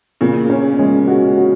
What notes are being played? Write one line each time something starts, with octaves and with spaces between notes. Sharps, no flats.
A#2 C#3
C#4
G#3
F#4
F#4